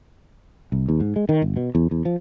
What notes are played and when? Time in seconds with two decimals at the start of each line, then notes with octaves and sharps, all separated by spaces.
0.72 C2
0.89 D#2
1.00 G#2
1.16 G#3
1.29 D#3
1.42 G1
1.57 B2
1.75 E2
1.91 E2
2.05 F3